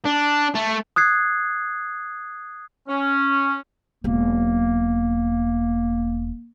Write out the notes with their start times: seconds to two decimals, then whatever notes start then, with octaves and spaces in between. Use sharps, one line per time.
0.05 D4
0.55 A3
0.96 D#6 F#6 G#6 C7
2.88 C#4
4.04 E1 F#3 A#3